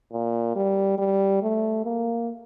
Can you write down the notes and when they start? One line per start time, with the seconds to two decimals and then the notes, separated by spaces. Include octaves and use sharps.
0.13 A#2
0.56 G3
0.99 G3
1.42 A3
1.85 A#3